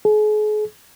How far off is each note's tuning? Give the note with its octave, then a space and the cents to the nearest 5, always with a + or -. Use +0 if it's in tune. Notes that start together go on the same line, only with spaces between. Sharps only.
G#4 +40